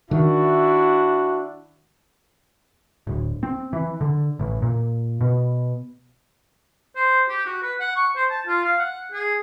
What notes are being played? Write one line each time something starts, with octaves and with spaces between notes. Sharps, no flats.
D#3 D4 E4 F#4
D1
C4
E3
D3
A1
A#2
B2
C5
G4
F#4
B4
F#5
C#6
C5
A5
F4
F5
F#5
G#4